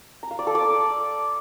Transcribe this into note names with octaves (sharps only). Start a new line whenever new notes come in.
A#5
F5
D5
A4
D5